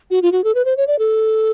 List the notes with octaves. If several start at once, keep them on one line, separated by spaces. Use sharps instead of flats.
F#4
F4
F#4
A4
B4
C5
C#5
D5
A4